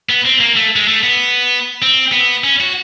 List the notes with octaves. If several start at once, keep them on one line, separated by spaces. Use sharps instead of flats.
B3
C4
A#3
A3
G#3
A3
B3
C4
B3
C#4
F#4